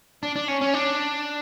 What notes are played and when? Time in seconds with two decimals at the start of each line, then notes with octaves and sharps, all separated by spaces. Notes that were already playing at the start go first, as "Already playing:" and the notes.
0.23 D4
0.36 D4
0.48 C#4
0.61 C#4
0.73 D4